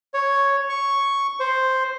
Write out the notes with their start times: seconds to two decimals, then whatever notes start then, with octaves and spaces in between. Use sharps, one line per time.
0.14 C#5
0.69 C#6
1.40 C5